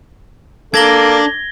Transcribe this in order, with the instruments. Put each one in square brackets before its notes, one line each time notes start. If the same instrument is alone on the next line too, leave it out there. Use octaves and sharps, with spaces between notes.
[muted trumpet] A#3 [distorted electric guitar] D4 [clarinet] A4 [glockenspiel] G#6 A#6 G7